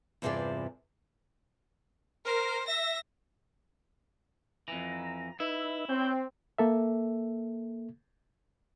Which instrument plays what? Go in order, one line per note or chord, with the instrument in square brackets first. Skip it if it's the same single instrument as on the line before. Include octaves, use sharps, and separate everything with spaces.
[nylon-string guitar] E2 G2 C3 F4 G#4 D5
[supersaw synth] A#4 [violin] C5
[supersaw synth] E5 [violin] A#6
[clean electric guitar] F2 E3 [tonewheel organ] A#5
[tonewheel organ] D#4 B4 E5 [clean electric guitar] E4
[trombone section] C4 [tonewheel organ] C#5 G6
[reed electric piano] A#3 A4 E5